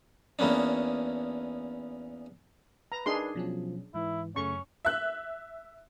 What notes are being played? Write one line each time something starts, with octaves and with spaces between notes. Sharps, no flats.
E2 A#3 B3 C#4 D4
B4 A#5
D4 D#4 G#4 A#4 D#5 C6
B2 F3 F#3 C#4
G#2 E3 E4
F#2 C#3 A3 C#4 C#6
E5 F#6